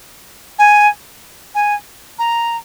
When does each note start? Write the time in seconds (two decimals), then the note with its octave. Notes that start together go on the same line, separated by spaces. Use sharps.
0.58 G#5
1.54 G#5
2.18 A#5